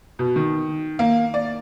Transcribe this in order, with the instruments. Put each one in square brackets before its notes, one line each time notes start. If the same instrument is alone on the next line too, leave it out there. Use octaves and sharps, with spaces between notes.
[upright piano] B2
D#3
A#3
D5